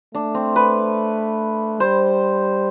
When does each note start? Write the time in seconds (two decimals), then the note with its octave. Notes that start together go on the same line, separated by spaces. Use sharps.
0.14 A3 D4
0.35 C4
0.56 B4
1.80 G3 C5